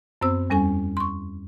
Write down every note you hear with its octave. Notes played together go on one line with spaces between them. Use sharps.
F#2 B3 C4 C5 E6
E2 G3 C#4 A4 G#5
C6 C#6